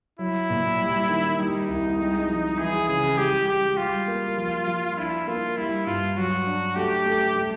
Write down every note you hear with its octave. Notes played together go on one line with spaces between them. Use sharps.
F#3 E4
A#2
G3
D#3
G3 D#4
C2
G#3
F3
E3 G#4
C#3 G#4
G#3 G4
G#3 G4
G3 F4
A#3
F3
F3
D4 E4
A#3 F4
G3 E4
G2 F4
F#3 F#4
D4
A3 G4
A3
A3